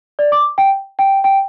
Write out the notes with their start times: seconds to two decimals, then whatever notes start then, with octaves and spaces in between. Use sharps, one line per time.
0.19 D5
0.32 D6
0.58 G5
0.99 G5
1.24 G5